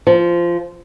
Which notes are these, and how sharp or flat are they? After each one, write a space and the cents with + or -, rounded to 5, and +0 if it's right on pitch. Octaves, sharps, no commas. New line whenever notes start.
F3 -15